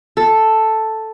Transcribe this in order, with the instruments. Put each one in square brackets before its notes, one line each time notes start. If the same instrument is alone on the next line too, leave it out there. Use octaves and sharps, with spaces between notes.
[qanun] A4